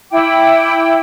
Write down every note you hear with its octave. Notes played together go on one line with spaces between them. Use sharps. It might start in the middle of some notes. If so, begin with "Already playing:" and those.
E4 G5 D6